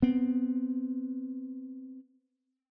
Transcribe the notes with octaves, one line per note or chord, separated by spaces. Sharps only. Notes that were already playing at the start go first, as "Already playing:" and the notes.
B3 C4